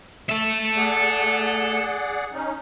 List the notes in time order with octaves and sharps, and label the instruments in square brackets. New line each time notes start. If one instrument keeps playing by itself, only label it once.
[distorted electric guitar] A4 E5
[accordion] G#4 D5 F#5
C#4 D#4